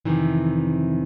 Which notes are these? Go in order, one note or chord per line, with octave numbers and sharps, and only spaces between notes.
F2 G#2 C3 D#3 E3